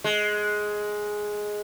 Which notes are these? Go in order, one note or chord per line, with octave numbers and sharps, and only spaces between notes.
G#3